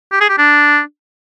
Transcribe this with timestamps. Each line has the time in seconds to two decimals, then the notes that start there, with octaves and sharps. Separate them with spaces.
0.12 G4
0.21 G#4
0.29 G4
0.38 D4